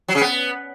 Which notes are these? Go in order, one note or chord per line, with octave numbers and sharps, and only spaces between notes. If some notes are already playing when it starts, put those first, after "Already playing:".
F#3
C#3
B3